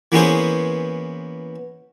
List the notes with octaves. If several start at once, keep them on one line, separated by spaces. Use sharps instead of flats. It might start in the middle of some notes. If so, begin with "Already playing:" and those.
E3 A#3 B3 C#4 G#4 C5